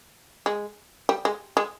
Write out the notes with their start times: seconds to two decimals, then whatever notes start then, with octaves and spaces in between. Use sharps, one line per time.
0.46 G#3
1.09 G3
1.25 G#3
1.57 G#3